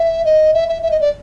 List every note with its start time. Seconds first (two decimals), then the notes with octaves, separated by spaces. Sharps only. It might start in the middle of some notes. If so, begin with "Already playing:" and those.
Already playing: E5
0.25 D#5
0.54 E5
0.68 E5
0.83 E5
0.91 D#5
1.01 D5